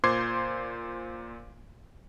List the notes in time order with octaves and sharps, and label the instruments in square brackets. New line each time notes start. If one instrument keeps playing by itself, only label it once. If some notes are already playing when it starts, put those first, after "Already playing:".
[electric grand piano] A#2 C5 C6 D6 G#6 C7